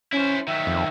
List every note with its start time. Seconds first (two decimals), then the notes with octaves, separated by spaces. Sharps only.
0.12 C#4 E4 C5
0.48 D#3 F#3 E5
0.67 F2